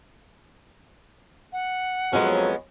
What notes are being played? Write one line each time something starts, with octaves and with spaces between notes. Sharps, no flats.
F#5
F2 F#3 G#3 B3 C#4